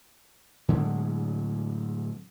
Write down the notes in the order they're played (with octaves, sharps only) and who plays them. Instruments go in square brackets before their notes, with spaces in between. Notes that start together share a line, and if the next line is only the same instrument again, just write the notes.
[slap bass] A2 D3 F#3 G#3